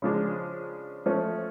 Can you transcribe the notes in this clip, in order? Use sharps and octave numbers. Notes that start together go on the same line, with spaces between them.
C#3 F3 G#3 D4
F3 A3 C#4